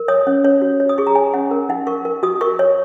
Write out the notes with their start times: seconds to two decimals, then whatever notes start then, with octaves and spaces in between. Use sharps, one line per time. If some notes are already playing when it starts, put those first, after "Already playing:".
Already playing: A#4
0.08 C#5 D#6
0.27 C#4
0.45 C#5
0.62 F#4
0.80 C#5
0.89 D#6
0.98 G#4 C#6
1.07 A#5
1.15 C#5 G#5
1.34 C#4 F#5
1.51 A#4
1.69 D#4 F#5
1.87 A#4 C#6
2.05 A#4
2.23 F#4 D#6
2.41 A#4 C#6
2.59 C#5